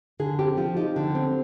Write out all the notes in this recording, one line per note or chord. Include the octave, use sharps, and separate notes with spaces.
D3 G#4
C4 G4
F3 F4
D#4 G4
D3
C4